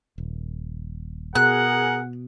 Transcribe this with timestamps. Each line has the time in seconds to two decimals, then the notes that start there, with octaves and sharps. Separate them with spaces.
0.18 D#1
1.35 B2 G#4 A#4 F#5 F#6